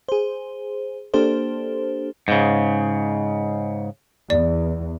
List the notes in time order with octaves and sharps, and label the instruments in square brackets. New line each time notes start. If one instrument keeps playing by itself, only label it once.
[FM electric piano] G#4 C5
A#3 D4 G4 A4 C5
[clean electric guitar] G#2 C#3
[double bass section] E2 [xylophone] D5